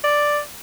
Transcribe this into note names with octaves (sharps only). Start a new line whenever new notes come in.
D5